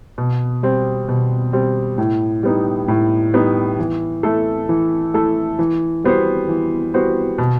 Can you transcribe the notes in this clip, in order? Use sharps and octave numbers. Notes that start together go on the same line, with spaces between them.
B2
G3 C4
B2
G3 C4
A2
G3 B3 D#4
A2
G3 B3 D#4
E3
A3 E4 A4
E3
A3 E4 A4
E3
G3 B3 F#4 C5
E3
G3 B3 F#4 C5
B2